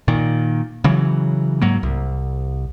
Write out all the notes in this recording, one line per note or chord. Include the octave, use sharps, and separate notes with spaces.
A#2 D#3
C#3 E3 F#3
G#2 F#3 A#3
C2